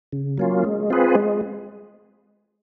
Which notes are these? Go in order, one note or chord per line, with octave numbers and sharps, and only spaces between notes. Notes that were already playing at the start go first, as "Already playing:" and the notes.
C#3
F#3 A#3 C#4 F4
G#3
C4 F4 G#4 B4
G#3